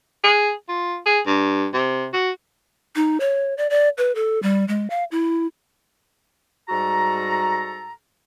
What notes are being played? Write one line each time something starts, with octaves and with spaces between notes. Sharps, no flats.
G#4
F4
G#4
G2
C3
F#4
D#4
C#5
D5
D5
B4
A4
G3
G#3
F5
E4
G#2 G3 F#4 A4 A#5